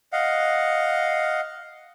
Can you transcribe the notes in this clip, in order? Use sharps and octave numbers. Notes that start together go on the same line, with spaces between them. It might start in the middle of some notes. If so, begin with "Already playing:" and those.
D#5 F5 F#5